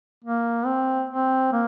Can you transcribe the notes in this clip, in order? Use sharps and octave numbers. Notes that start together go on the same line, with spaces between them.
A#3
C4
C4
A#3